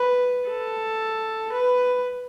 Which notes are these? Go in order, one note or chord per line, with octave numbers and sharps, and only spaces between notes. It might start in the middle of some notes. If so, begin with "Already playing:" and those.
Already playing: B4
A4
B4